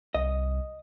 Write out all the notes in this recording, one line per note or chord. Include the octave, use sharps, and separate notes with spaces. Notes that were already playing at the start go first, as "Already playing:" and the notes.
C2 D#5